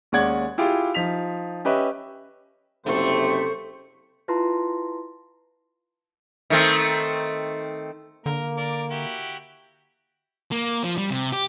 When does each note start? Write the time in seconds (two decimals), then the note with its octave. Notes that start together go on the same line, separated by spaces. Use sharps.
0.12 D#2 G#3 C#4 D5 F#5 G#6
0.58 E4 F4 G4 G#4
0.94 F3 D#4 B6 F7
1.65 C#4 G4 B4 D#5 E5
2.86 F#1 C3 A3 C5 C#6
4.28 E4 F4 B4 A5 A#5 C6
6.50 D#3 A3 C4
8.26 D3 A#3 A#4
8.57 A#4 D5
8.90 E4 F#4 G4
10.52 A#3
10.84 F3
10.98 G3
11.10 C3
11.32 G4